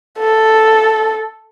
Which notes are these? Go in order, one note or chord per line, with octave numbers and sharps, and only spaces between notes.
A4